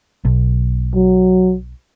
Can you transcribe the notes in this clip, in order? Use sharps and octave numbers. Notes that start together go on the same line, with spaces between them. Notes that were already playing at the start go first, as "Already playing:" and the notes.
B1
F#3